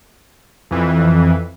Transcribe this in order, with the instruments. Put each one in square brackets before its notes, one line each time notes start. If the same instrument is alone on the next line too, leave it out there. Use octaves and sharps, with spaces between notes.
[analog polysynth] F2 E3